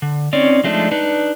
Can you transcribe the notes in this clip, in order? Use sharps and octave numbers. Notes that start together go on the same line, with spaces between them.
D3
C4 C#4 D#4 C#5 D5
F3 G#3 A3 C4 D4 D#4
D4 D#4 B4